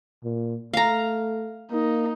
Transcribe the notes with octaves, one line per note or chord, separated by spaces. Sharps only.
A#2
A3 F5 A#5
A#3 D#4